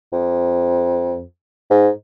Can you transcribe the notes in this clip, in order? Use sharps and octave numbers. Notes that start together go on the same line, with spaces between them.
F2
G#2